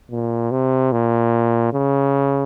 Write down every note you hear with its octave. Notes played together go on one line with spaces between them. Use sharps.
A#2
C3
A#2
C#3